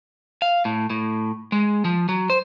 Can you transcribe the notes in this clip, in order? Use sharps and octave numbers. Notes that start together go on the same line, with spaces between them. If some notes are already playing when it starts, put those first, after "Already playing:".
F5
A2
A2
G#3
F3
F#3
C5